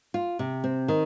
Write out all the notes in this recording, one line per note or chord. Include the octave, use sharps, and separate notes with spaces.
F4
C3
C4
D#3